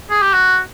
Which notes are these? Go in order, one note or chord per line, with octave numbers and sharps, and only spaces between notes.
G#4
G4
F#4